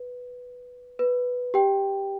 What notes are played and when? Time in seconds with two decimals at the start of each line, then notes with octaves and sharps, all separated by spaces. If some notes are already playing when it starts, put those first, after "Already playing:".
Already playing: B4
0.99 B4
1.54 G4 G5